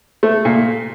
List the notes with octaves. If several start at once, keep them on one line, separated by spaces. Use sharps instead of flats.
A3
A#2